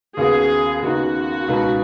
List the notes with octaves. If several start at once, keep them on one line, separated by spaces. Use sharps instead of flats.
D#2 C#3 B3 F#4 G#4
D#2 C#3 B3 D#4 F#4
C#2 B2 B3 D#4 B4